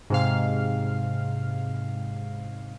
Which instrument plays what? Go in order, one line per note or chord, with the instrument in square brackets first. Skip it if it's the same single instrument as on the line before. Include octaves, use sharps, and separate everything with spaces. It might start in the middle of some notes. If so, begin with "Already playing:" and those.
[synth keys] G#2 C3 F5